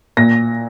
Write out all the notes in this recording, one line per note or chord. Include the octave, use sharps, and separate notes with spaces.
A#2 A#6